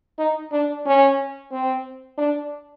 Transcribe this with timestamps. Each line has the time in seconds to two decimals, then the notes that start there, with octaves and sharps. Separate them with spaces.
0.19 D#4
0.52 D4
0.86 C#4
1.52 C4
2.18 D4